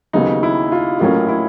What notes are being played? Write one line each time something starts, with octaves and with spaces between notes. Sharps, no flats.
D#2 C#3 F#3 B3 D#4
E4
F4
A2 F#3 A#3 C#4 F4
E4